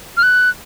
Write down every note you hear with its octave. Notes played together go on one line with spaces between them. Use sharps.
F6
F#6